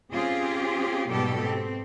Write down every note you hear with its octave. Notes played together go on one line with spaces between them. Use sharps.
C4 C#4 F4 G4 G#4
G#2 B2 G3 G4 A4
C4